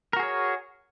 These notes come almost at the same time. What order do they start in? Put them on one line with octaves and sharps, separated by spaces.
A#4 F#4 G#4 C#5